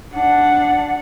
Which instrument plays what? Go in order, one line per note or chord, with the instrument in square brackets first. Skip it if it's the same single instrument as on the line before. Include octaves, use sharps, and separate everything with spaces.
[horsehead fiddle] D4 F#5